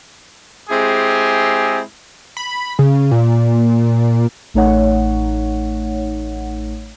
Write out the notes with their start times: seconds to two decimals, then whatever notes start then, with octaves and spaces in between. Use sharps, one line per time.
0.70 G#3 C4 E4 G4 G#4
2.37 B5
2.79 C#3
3.11 A#2
4.54 A1 A3 D#4 C#5 F#5